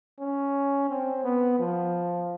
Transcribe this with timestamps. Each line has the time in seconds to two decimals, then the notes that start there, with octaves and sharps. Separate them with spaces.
0.19 C#4
0.89 C4
1.24 B3
1.59 F3